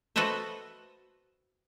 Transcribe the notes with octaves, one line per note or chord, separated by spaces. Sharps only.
F#4 A4 B4 C5 D#5 E5